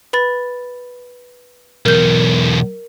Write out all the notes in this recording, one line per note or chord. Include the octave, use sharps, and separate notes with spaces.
B4 B5 A6
B1 E2 A#4 G6